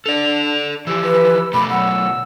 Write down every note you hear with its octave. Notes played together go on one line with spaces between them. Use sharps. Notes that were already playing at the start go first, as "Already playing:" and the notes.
D4 A4 D5 F7
E3 F3 G4 E6
B4
B2 A3 B5 D6
F#3 F#5 E6